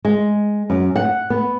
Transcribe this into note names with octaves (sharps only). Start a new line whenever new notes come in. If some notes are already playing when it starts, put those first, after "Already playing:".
G#3
F#2
F#5
B3